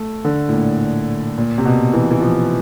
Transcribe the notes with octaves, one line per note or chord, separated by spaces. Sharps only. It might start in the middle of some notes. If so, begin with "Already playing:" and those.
Already playing: A3
D3
A2
A#2
A#2
C3
B2
E3
E3
F3